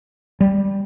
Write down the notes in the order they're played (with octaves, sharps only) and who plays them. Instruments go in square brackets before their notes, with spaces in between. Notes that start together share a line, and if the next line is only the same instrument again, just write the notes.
[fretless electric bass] G3